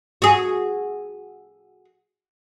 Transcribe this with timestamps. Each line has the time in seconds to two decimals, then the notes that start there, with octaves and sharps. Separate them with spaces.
0.22 F#4 G#4